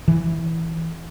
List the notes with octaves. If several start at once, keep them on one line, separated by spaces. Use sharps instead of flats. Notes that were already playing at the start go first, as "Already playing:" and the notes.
E3